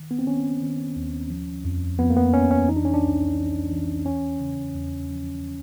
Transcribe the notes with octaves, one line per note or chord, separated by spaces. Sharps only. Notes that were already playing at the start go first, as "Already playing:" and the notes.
Already playing: D#3
B3
C4
D#3 C#4
D#3
D#2
F3
F2
F2 B3
A#3
B3
F2 C#4
C#4
E3 D#4
D4
C#4
D4
C2
E3
E3
E2 C#4
C#3
E2
F3